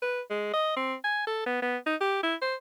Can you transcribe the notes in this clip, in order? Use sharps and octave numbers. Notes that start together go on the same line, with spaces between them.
B4
G#3
D#5
C4
G#5
A4
B3
B3
D#4
G4
E4
C5